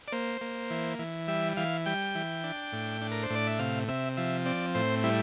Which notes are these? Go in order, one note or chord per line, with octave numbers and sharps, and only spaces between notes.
D5
A#3 C5
A#3
E3
E3
G3 E5
E3 F5
G3 G5
E3
D4
A2
D4
A#4
C5
A2
D5
E5
C3 F5
C3 E5
F3 E5
C4 D5
A2 C5
G3 E4